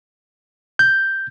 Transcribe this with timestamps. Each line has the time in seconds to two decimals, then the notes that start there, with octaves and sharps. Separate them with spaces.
0.79 G6